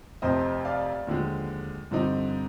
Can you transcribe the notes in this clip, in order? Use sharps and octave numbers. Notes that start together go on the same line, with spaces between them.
F1 F2 C3 C5 D#5
D5 F5
D#2 D3 F3 G#3
G2 D3 F3 C4 D#4